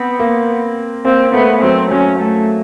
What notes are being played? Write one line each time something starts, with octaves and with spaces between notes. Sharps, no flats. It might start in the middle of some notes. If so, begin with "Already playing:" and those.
Already playing: B3 C4
A#3
A#3 C4
A3 B3
F#3 C4
F#3 C#4
A3